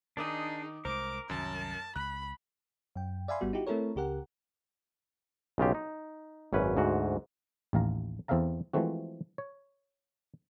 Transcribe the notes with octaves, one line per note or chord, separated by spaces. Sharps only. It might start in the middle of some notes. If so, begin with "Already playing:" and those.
D#3 D4 D#4 G#4 D6 D#6
C2 G#3 A#4 C5 D6
C2 F#2 D#3 F#3 A5
C#2 B5 F#6
F#2 G5
D5 E5 F5 G#5 B5 C6
G#1 G3 B3 F#4
D#4 E4 F#4 G4
A3 C4 E4 A4 A#4 C#5
C#2 C#3 G4 A#4 F#5
B1 C#3 F4 G4
D#4
G#1 F#2 C#4 B4
D2 G#2 F#4
A1 D#2 F5 A#5
E2 C4 A4 E5 F5 A#5
E3 F3 G#3 A3 C4 F#4
C#5